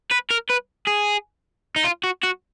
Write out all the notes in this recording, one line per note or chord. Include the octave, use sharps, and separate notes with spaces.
B4
A#4
B4
G#4
D#4
F4
F#4
F#4